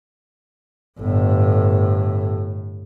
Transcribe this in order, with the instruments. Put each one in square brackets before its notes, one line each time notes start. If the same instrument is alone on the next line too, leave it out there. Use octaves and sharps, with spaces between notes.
[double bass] G1 A2